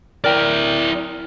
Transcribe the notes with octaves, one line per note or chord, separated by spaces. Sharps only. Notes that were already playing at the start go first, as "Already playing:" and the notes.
E4 A#4 D5 G5